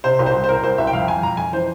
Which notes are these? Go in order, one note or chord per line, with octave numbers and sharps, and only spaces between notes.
C3 C5
C2
C5
C2
C5
C2 A#4
C2 C5
C2 E5
G5
F2 F5
F2 G#5
F2 A#5
F2 G#5
E3 C5